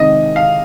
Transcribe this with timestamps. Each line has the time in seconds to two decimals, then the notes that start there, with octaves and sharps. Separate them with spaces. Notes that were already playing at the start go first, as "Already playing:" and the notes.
Already playing: C3 D#3 G#3 C4 D#5
0.36 F5